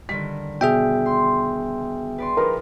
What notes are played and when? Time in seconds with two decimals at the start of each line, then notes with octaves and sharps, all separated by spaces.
0.09 D3 D#3 G3 B6
0.61 B2 G#4 E5 G5
1.06 C6
2.18 B4 D5 C6
2.37 F3 D#4 A#4 B4